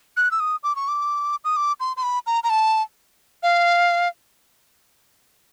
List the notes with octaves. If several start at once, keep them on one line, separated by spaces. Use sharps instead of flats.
F#6
E6
D#6
D6
C#6
D6
D#6
D6
C6
C6
B5
A#5
A#5
A5
F5